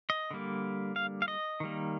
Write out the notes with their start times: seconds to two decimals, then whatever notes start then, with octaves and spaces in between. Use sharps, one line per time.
0.10 D#5
0.31 D3 G3 A#3
0.96 F5
1.22 F5
1.28 D#5
1.60 D#3 G3 A#3